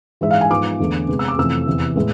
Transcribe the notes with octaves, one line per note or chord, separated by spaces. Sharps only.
G#2 E3 G#3 E5
F5
G#5
G#2 F3 B3 D6
E2 D3 A3
C3 G#3 B3
E6
D6
F2 C3 E3 A3 E6
E2 C3 E3
A2 G#3 B3